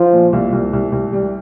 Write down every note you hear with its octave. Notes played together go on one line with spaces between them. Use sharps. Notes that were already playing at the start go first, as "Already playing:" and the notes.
Already playing: F3
A#2
C2
C2
C2
C2
G3